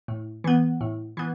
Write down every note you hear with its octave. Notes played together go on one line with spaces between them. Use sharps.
A2
E3 B3
A2
E3 B3